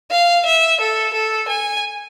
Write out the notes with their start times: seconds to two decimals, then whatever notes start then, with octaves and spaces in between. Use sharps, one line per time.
0.11 F5
0.46 E5
0.81 A4
1.14 A4
1.48 G#5